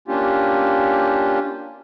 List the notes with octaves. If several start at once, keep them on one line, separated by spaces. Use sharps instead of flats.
A#3 C#4 D4 F4 G4